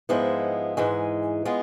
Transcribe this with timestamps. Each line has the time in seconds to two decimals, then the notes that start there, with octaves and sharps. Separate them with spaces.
0.09 G#2 F3 G#3 B3 E4
0.77 G#2 E3 G#3
1.45 G#3 B3 F4